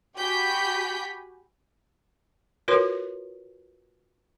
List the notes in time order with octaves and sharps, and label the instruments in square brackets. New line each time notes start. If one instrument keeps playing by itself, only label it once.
[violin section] F#4 G4 G#5 B5 G6 B6
[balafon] F4 F#4 A#4 B4 C#5 C6